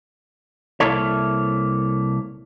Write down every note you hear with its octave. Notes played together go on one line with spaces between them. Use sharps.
C2 A#3 E4 A4 C#5